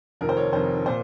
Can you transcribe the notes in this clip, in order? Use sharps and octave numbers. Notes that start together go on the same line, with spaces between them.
F1 F2 D#3 A#4
C5
C#5
F1 F2 D#3 C5
A#2 C5